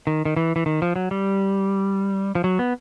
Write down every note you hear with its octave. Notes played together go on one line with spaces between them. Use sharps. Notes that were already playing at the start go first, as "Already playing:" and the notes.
D#3
D#3
E3
E3
D#3
F3
F#3
G3
F3
F#3
B3